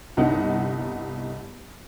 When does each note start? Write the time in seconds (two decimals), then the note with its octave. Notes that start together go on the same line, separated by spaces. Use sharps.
0.17 G1 C2 G2 D#4 D#5 F#5